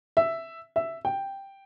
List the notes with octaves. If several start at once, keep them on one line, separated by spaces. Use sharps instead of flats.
E5
E5
G5